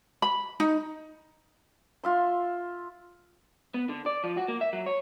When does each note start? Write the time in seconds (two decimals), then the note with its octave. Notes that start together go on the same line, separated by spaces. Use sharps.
0.22 B5
0.60 D#4
2.04 F4 E5 C6
3.74 B3
3.89 D3
4.06 D5
4.24 F3
4.37 F#4
4.48 A#3
4.61 E5
4.73 F#3
4.86 C#5